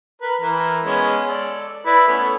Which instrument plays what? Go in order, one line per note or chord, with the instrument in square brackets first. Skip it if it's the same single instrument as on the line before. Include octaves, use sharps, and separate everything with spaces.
[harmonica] A#4 B4
E3 A#4
G#3 B3 C#4
A4 D5
E4 B4 D5
A3 B3 C#4